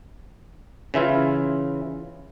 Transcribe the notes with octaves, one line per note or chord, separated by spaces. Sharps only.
C#3 E3 E4 F4